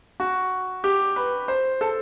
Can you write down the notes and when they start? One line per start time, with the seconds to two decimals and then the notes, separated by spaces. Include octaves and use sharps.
0.20 F#4
0.84 G4
1.16 B4
1.48 C5
1.81 A4